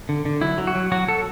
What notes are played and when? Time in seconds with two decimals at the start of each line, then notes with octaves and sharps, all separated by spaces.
0.09 D3
0.25 D3
0.41 F#3 E4
0.58 F#3
0.67 F#4
0.75 F#3
0.92 F#3 F#4
1.08 F#3 A4